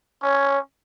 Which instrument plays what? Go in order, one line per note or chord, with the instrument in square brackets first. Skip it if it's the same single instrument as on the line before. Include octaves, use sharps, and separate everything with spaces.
[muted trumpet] C#4 [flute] C#5